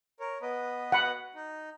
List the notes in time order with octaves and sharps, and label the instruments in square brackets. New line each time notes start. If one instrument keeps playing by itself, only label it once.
[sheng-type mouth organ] A#4 C#5
B3 B4 D#5
[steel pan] F#5 B5
[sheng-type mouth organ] D#4